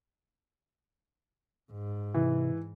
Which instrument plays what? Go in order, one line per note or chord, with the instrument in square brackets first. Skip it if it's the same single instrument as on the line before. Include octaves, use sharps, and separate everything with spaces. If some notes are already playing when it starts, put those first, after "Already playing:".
[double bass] G#2
[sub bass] C3 [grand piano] E3